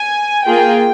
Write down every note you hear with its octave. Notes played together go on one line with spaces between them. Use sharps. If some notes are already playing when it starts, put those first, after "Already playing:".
Already playing: G#5
A#3 F4 G#4 G5